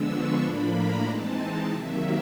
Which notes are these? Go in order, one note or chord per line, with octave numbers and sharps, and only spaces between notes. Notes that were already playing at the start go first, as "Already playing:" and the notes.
Already playing: D3 F3 G#3 B3 D4 E6
C#6
A2 F3 A#3 D4 B5
A#5
E3 G#3 C4 D#4 A5
C3 D#3 F#3 A#3 E5